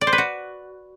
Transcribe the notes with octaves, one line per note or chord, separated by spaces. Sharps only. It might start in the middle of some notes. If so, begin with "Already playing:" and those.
D5
C5
B4
F#4